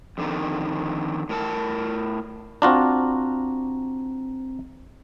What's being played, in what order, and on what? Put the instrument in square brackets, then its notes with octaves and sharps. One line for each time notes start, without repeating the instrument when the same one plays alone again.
[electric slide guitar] F2 D3 D#3
A2 A#4 A5
[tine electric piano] C4 A#5 [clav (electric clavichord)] D4 F4 F#4